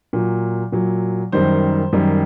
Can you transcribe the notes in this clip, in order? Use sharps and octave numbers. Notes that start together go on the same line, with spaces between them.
A#2 F#3
A#2 F#3
F#2 D#3 G3 C5
F#2 D#3 G3